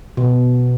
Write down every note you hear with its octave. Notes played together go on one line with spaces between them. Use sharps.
B2